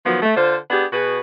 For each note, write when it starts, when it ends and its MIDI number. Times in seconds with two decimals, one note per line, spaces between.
0.06 0.21 51
0.06 0.21 53
0.06 0.21 54
0.06 0.21 59
0.22 0.37 57
0.37 0.57 50
0.37 0.57 65
0.37 0.57 72
0.71 0.86 59
0.71 0.86 62
0.71 0.86 67
0.71 0.86 68
0.93 1.21 47
0.93 1.21 66
0.93 1.21 68
0.93 1.21 71